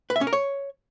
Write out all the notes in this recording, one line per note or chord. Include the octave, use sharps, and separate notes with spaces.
B4
E5
C#4
A#4
C#5